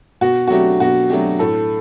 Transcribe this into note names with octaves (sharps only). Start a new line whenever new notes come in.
B2 F#4
F#3 A3 D4 F#4 G4
B2 F#4
F#3 A3 D4 G4
A2 A4